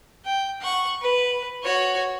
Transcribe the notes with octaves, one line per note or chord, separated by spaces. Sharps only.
G5
F#5 C#6
B4
F#4 C#5